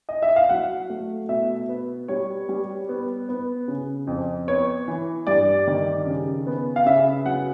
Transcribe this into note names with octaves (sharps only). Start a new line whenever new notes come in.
D#5
E5
F5
F#3 F#5
A3
B2 E5
B3
G3 C#5
G3
B3
B3
C#3
F2
B3 C#5
E3
G2 D5
D#3
C#3
B3
F5
C#3 E5
F#3 F#5